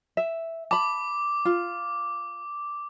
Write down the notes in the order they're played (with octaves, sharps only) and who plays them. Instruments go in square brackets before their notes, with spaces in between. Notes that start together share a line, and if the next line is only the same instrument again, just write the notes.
[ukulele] E5
[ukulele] A5 B5 [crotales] D6
[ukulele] F4